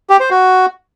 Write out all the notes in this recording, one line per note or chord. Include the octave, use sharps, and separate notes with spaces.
G4
C5
F#4